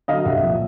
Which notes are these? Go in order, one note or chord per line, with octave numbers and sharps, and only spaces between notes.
D3 F#3 D#5 F5
C2 E5 F#5
A#2 F3